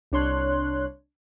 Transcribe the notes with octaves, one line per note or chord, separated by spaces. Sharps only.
C2 D4 C#5 C6 F#6